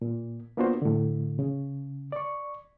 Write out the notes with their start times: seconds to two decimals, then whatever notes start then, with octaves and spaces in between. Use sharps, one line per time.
0.02 A#2
0.57 A#3 B3 D4 F4 F#4 C5
0.82 A2 D3
1.39 C#3
2.12 D5 C#6